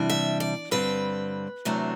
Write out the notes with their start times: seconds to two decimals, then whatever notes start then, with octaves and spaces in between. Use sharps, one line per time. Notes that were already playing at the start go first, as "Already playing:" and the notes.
Already playing: C3 E3 G3 D4
0.09 E5
0.40 D5
0.71 G2 D3 G3 C4 B4
1.65 E2 C3 F#3 A3 D4